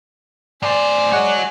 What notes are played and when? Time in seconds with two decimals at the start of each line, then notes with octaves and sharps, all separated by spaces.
0.62 A2 C5 D5 G#5
1.12 G#3 F#4 C#5 F#5